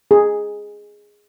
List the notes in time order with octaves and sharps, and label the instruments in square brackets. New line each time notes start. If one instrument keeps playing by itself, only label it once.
[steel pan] G#4